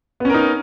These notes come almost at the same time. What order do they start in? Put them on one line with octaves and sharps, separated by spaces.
B3 C#4 A#4 D#4